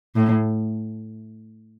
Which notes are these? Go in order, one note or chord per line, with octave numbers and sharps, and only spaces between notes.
A2